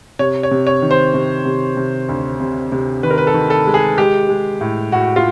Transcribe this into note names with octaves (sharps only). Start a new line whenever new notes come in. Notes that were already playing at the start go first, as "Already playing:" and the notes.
C3 C#5
C#5
C3
C#5
D#3
C5
C3
C3
C3
D2
C3
C3
D#3 B4
A#4
B4
A4
D#3
A4
G#3
G#4
G#3 G4
G#3
A2
A2 F#4
F4